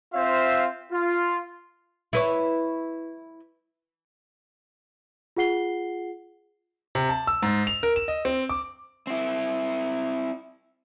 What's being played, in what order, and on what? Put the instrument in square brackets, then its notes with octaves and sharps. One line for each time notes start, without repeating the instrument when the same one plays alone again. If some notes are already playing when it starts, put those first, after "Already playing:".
[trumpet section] C4 F4 C5 E5 F5
F4
[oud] E4 B4 C#5
[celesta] F4 G#4 F#5 C7 G7
[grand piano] C3
A5
E6
G#2
F7
A#4
E7
D#5
C4
D6
[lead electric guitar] C4 E4